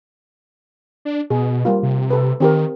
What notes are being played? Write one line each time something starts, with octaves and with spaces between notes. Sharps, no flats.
D4
B2 G#4
G3 A#3 F4
C3
A4 B4
D#3 C4 G4 A#4